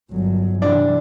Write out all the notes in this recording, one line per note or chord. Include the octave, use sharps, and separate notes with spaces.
G1 F#3
C3 E3 D4